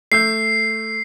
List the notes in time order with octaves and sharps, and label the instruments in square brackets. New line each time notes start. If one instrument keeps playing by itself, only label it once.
[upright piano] A3 E6 G6 [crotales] C7